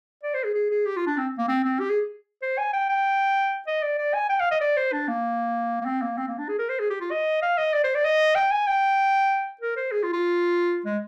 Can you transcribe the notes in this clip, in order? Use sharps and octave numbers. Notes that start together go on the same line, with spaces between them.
D5
C5
G#4
G#4
G#4
G4
F4
D4
C4
A#3
C4
C4
G4
G#4
C5
G#5
G5
G5
D#5
D5
D5
G#5
G5
F5
D#5
D5
C5
D4
A#3
A#3
C4
A#3
C4
A#3
D4
G#4
A#4
C5
G#4
G4
F4
D#5
F5
D#5
D5
C5
D5
D#5
G5
G#5
G5
A#4
C5
G#4
F4
F4
G#3